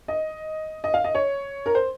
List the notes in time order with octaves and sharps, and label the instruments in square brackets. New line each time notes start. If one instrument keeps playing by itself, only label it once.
[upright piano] D#5
D#5
F5
D#5
C#5
A#4
C5